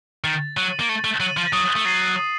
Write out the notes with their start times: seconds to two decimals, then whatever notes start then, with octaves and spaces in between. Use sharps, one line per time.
0.24 D#3 A6
0.57 F#3 D#7 F#7
0.80 A#3
0.89 A3 A6
1.04 A3
1.20 F#3 D#7 F#7
1.37 F3
1.53 F#3 D#6
1.76 A3
1.85 F#3 A6 C7 D#7 F#7
2.16 D#6